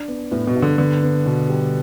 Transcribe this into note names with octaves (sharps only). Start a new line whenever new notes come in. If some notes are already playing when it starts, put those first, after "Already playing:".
Already playing: D4
B3
A2 B3
B2
G2
D3
D3 B3
B3
B2
G3